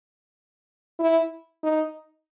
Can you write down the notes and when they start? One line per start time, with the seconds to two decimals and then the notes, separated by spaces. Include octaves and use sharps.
1.00 E4
1.63 D#4